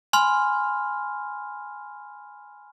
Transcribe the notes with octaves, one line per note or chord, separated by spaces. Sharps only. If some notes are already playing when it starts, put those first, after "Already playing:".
G#5 B5 C6 F6